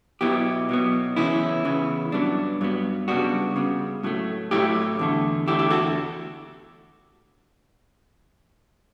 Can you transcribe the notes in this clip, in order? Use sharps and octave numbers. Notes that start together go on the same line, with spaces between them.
B2 F#3 B3 E4 G4
B2 F#3 B3
C#3 E3 B3 C#4 E4
C#3 E3 B3
G2 F#3 B3 D4
G2 F#3 B3
C#3 G3 B3 D4 F#4
C#3 G3 B3
A2 F#3 A3
A2 F#3 A3 E4 G4
E2 D3 A3
E2 D3 A3 E4 G4
E4 G4
F#4 A4